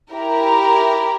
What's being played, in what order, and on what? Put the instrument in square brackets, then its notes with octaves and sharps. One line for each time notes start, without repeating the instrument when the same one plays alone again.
[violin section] E4 G4 A#4